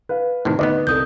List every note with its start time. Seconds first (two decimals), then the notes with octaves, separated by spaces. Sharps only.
0.09 B4 F5
0.45 A2 C3 D#3
0.59 D2 D#3 B3 B4 D#5 D6
0.87 C2 A4 D#6 G6